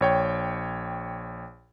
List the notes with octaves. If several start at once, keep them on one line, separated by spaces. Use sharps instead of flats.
A#1 C#5 G5